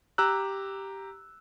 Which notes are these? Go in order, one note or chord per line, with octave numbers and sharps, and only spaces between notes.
G4 A#5 E6 F#6